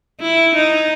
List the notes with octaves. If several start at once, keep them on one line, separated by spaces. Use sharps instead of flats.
E4
D#4